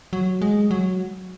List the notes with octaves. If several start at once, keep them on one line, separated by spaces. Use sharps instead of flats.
F#3
G#3
F#3